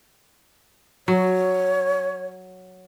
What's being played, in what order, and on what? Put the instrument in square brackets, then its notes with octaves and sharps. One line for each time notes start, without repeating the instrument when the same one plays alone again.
[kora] F#3 [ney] C#5